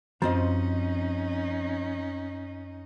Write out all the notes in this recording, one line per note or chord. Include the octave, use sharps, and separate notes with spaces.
F#2 F3 C4 C#4 D#4 D#5